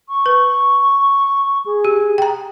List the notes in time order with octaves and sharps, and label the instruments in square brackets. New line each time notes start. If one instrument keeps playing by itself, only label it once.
[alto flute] C#6
[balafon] B4
[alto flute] G#4
[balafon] G4
G5 A#5